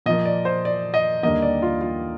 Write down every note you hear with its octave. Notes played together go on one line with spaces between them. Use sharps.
A#2 F3 A#3 D#5
D5
C5
D5
D#5
D#2 D3 G3 A#3 D#5
D5
F4
F4